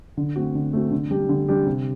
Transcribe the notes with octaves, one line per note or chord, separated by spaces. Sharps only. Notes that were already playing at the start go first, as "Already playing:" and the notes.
D3
A3 C4 F#4
D3
A3 C4 F#4
D3
G3 D4 G4
D3
G3 D4 G4
C3